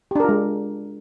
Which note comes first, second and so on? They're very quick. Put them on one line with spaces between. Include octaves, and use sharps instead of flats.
G4 D4 A#4 F4 G#3